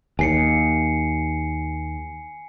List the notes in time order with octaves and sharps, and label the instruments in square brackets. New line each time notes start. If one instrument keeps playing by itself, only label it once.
[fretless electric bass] D#2 [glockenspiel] G#5 C7 C#7